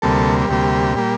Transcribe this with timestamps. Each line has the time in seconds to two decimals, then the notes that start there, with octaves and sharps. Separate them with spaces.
0.02 D2 C3 G3 A#3 A4
0.49 D2 C3 G3 A#3 G4
0.96 A#2 G3 A#3